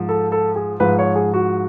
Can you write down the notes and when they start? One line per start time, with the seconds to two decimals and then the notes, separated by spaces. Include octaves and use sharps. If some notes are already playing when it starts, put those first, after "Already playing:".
Already playing: G#2 F3
0.09 A4
0.32 A4
0.56 G#4
0.80 G#2 F3 B4
0.99 C#5
1.16 G#4
1.34 F#4